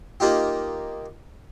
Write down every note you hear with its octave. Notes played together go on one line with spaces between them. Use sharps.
A#3 D#4 F4 G4